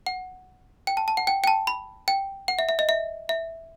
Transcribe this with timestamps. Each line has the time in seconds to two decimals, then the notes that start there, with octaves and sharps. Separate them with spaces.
0.07 F#5
0.87 G5
0.97 A5
1.08 A5
1.17 F#5
1.27 G5
1.44 G5
1.47 A5
1.67 B5
2.08 G5
2.48 F#5
2.59 E5
2.69 E5
2.79 D#5
2.89 E5
3.29 E5